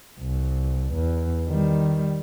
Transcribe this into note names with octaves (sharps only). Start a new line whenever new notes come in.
C2
E2
D#3 G3